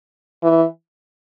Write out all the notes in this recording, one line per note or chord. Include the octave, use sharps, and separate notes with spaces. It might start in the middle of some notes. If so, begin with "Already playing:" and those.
E3